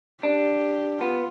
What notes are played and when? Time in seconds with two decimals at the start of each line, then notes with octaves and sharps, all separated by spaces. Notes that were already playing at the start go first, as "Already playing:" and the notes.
0.23 D4 G4
1.00 B3 F4